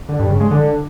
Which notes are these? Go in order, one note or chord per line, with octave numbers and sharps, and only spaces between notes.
D3
G2
C#3
G#3
D3